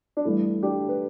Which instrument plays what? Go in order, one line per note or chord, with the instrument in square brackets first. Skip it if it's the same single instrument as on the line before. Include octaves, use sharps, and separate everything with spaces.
[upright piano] D4
G2 E3 A3 E4
D4 G4
B4